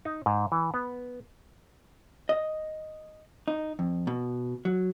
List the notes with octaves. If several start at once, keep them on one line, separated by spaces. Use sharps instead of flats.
D#4
G#2
E3
B3
D#5
D#4
F2
B2
F#3